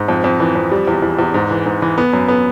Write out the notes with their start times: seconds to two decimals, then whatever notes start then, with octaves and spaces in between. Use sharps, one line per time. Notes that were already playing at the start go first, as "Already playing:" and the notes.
Already playing: G#2
0.08 F2
0.24 F2
0.40 E3
0.55 F2
0.71 G3
0.88 E2
1.02 E2
1.19 E2
1.34 G#2
1.51 E3
1.66 G#2
1.82 E3
1.98 B3
2.13 F#2
2.28 B3